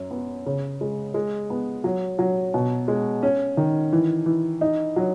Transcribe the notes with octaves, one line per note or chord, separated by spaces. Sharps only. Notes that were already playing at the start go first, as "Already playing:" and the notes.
Already playing: F#2
B3
C#3
G#3
G#3
B3
F#3
F#3
B2
G#3
C#4
D#3
E3
E3
D#4
F#3